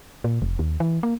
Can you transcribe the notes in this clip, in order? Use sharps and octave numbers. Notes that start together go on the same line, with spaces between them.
A#2
F1
D#2
E3
A#3